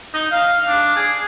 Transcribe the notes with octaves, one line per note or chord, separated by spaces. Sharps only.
D#4
F5
D4
G#4